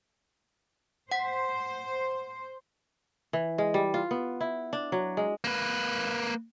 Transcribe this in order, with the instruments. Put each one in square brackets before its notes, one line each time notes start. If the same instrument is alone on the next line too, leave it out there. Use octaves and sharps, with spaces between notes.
[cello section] C5 [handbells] F#5 B6
[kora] E3
G#3
G3
F4
B3
E4
D4
F#3
G#3
[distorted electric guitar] A#3 B4